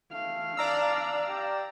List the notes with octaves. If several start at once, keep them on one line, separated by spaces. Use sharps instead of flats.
A3 F5
D4 D5 A#5 E6
G4